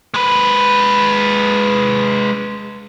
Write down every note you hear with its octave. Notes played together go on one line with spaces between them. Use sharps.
G#3 B4